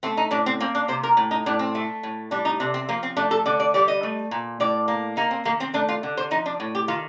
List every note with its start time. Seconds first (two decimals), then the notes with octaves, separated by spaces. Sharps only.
0.03 A3 C4
0.17 D#4
0.31 A2 D4
0.46 C4
0.60 A#3 C4
0.75 D4
0.88 C3 C5
1.03 A#4
1.17 A2
1.31 D#4
1.46 A2 D4
1.59 C4
1.75 A3
2.03 A2
2.31 G3 D4
2.45 D#4
2.60 C3 D4
2.74 C4
2.89 F3 A#3
3.03 C4
3.17 A3 D4
3.31 A4
3.46 D3 D5
3.60 D5
3.74 G3 D5
3.88 D#5
4.03 A3
4.31 A#2
4.60 A2 D5
4.88 A#3
5.17 A#3 D#4
5.31 C4
5.45 D#3 A#3
5.60 C4
5.74 A3 D4
5.89 F4
6.03 D3
6.17 C5
6.31 F3 D#4
6.46 D4
6.60 A2
6.75 G4
6.88 D#3 F4